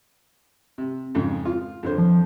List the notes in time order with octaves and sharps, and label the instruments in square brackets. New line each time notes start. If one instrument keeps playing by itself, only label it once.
[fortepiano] C3
F2 G#2 C#3
F4
F2 D3 C5
[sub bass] F3